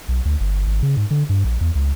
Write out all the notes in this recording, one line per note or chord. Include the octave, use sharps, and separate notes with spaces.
B1
D2
G1
G#1
C#3
G#2
D3
G2
A#1
E2
C#2